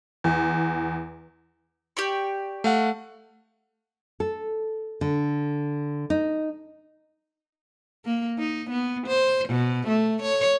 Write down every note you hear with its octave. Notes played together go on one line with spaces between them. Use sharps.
E2
G4 D5 C#6
A3 F5 F#5
A4
D3
D#4
A#3
D#4
B3
C5
B2
A3
C#5